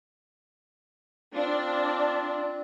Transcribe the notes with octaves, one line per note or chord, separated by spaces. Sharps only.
C4 D4 F4